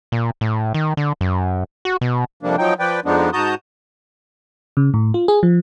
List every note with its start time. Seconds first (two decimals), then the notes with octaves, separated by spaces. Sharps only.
0.12 A#2
0.41 A2
0.74 D#3
0.97 D3
1.21 F#2
1.85 F#4
2.01 B2
2.43 F2 C3 F3 G3 A#3 D4
2.58 F3 F#3 D#4 G5
2.79 F3 B4 D5 G5
3.05 F2 F3 G#3 B3 D4 D#4
3.33 G#2 F#4 A5 A#5 D#6 G6
4.77 C#3
4.94 A2
5.14 F4
5.28 G#4
5.43 F3